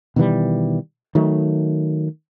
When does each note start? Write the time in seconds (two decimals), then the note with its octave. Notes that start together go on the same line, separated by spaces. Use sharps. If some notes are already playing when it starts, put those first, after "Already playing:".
0.16 B2 D#3 E3 G3
1.15 D#3 F#3 A3